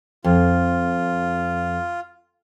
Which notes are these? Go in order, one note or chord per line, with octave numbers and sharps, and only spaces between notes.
F2 F4